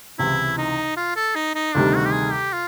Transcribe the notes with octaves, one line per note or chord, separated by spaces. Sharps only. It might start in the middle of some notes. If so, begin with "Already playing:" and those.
C#2 C3 E3 E4
D#4
F4
A4
D#4
D#4
D2 C3 D#3 G3 D4
F#4
G4
G#4
G4
F4